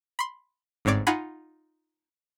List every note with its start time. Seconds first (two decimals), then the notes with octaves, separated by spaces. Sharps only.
0.19 B5 C6
0.85 G1 G#2 C4 C#5 D5
1.07 D#4 F4 F#5 G#5 B5